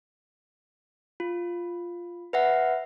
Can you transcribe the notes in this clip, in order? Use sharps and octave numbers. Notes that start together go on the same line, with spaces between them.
F4
B4 E5 F#5